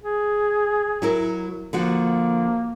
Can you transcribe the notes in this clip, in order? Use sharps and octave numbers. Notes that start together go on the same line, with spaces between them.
G#4
F#3 E4 A#4
D3 F3 A#3 F#4